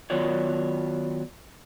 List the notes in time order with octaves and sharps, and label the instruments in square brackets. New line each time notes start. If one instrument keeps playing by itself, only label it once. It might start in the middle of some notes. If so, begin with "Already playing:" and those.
[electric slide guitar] D#3 F#3 B3 F4 C#5 D5